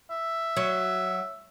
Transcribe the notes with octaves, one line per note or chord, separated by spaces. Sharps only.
E5
F#3